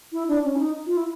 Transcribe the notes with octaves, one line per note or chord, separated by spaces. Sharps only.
E4
D4
C#4
E4
D#4
F4
E4